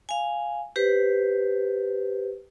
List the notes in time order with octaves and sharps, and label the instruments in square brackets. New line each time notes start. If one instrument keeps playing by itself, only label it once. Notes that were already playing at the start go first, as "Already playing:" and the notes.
[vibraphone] F5 G#5
G4 B4 C5